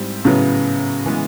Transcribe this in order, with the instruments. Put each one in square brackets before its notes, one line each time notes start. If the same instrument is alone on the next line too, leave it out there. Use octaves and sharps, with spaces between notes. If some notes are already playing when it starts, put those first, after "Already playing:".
Already playing: [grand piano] G#2 G3 C4 E4
[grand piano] A2 F#3 B3 [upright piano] C#3
[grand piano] E3 G#3 B3